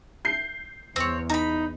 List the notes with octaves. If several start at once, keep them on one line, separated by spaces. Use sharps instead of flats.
G6 C7
E2 C4 C#5
D#4 A#5 B5